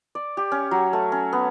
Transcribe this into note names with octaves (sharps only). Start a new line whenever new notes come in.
D5
G4
C#4
F#3
A3
C#4
B3